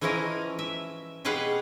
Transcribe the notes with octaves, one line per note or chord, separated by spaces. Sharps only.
E3 F3 C#4 E4 A#4 D#5
E5
B2 G4 G#4 B4 F5 F#5